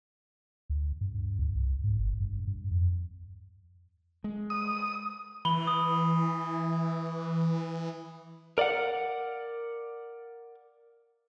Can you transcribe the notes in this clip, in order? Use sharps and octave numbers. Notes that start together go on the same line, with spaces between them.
D2
G2
G2
D2
C2
G#2
G1
G2
G2
F2
G#3
D#6
E3 B5 G7
D#6
A#4 D5 F5 F#5